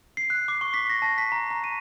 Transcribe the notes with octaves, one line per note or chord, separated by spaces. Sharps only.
C7
F#6
D6
C#6
B6
A#6
A5
B6
A#5
A#5
D#7